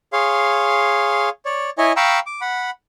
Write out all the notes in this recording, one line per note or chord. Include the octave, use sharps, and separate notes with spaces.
G#4 C#5 F5 C6
C#5 D5
E4 C#5 D#5 G#5
F5 G5 A#5 B5 C#6 E6
D6
F#5 B5